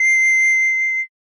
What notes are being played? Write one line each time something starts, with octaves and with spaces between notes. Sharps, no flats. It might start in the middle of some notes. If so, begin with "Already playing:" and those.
Already playing: C7